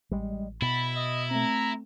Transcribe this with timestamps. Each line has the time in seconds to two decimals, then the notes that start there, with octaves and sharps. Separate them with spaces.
0.11 A1 G3 G#3
0.62 B2 E4 B5 A6
0.96 D#5
1.31 A3 C4 A#5